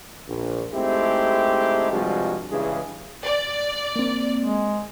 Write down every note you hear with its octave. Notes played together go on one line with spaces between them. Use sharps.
A#1
G#3 A3 C4 D#4 E4 G4
G2 C3 F3 G3 G#3 F#4
G2 C#3 E3 G#3 E4 G#4
D5
A#3 C4
G#3